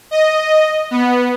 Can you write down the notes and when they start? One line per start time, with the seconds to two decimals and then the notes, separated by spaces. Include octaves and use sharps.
0.11 D#5
0.91 B3